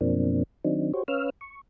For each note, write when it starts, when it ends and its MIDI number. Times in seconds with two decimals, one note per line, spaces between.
0.01 0.43 42
0.01 0.43 47
0.01 0.43 53
0.01 0.43 58
0.01 0.43 60
0.01 0.43 62
0.65 0.92 51
0.65 0.92 54
0.65 0.92 60
0.65 0.92 62
0.65 0.92 63
0.94 1.03 66
0.94 1.03 67
0.94 1.03 72
0.94 1.03 73
1.08 1.30 61
1.08 1.30 71
1.08 1.30 73
1.08 1.30 77
1.08 1.30 88
1.08 1.30 89
1.41 1.61 85